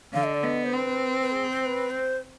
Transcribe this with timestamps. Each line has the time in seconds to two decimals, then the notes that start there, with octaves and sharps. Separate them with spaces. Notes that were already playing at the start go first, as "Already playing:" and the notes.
0.14 D3 F5
0.24 D#5
0.34 D5
0.43 B3 D#5
0.65 C5
0.72 C4 B4
1.21 B4
1.32 G#4
1.50 C5
1.61 C5
1.66 B4
1.90 C5